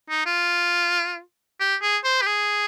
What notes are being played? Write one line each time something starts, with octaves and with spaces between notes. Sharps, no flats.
D#4
F4
G4
G#4
C5
G4
G#4